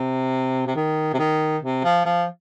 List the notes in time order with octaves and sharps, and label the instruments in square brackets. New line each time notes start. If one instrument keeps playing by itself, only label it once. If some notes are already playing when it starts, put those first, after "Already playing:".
Already playing: [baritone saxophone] C3
C3
D#3
C3
D#3
C3
F3
F3